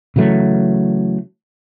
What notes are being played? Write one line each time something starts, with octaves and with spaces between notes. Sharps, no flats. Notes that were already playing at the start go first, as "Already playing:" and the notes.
C#3 E3 F#3 A3